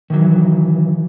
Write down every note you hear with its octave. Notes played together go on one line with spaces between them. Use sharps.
D#3 E3 F#3